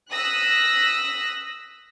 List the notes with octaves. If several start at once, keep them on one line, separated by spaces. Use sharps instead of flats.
D#6 E6 F#6 A#6 B6